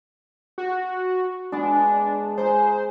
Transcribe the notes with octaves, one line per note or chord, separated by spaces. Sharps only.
F#4
G#3 B3 D4
G#3 C5 A#5